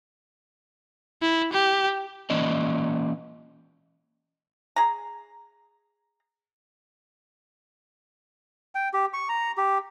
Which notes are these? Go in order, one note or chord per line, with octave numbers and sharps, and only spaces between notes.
E4
G4
E3 A#3 C#4 D5 D#5
G#4 A#5
G5
G4
C#6
A#5
G4